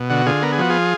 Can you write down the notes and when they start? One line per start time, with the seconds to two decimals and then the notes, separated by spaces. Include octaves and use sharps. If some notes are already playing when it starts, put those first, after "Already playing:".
Already playing: B2
0.10 D3 F#4
0.26 D3 F4 G#4
0.42 B3 A#4
0.52 G#4
0.58 F3 F#4
0.70 F4 G#4